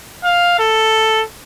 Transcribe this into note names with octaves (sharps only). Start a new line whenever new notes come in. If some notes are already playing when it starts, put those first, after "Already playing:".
F5
A4